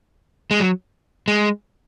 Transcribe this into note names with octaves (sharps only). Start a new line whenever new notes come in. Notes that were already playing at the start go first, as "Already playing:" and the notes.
G#3
F#3
G#3